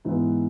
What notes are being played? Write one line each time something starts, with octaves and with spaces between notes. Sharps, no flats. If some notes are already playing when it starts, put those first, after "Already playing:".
G#2 E3 G#3 B3